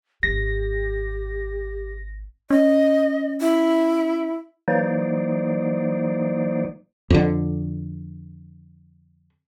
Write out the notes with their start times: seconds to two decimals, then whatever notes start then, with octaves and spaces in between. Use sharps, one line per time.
0.23 G#1 C4 G4 A#6
2.50 C#4 D#5
3.40 E4
4.68 E3 F#3 A#3 D#4 C5 D5
7.10 F2 D3